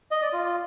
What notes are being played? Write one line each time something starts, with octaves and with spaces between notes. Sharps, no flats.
D#5
D5
F4